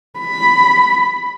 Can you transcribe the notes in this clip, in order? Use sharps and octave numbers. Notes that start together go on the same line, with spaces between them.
B5